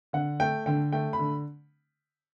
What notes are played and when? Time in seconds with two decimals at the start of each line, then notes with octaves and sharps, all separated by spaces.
0.13 D3 F#5
0.40 A3 G5
0.66 D3 G5
0.92 A3 G5
1.13 B5
1.19 D3